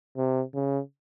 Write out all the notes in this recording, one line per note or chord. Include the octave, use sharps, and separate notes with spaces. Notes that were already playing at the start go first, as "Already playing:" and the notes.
C3
C#3